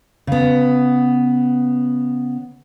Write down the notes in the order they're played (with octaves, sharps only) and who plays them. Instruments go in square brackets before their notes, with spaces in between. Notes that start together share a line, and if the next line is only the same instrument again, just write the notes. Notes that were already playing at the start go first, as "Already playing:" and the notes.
[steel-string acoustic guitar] C#3 B3